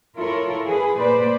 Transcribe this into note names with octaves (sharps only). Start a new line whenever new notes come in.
E4 F4 A4 A#4 C#5
E3 G#4 B4
A#2 A#3 B4 C5 D5